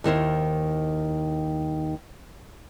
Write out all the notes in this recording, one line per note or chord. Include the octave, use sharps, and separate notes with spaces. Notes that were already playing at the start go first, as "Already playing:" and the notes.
D#2 D#3 E4 C5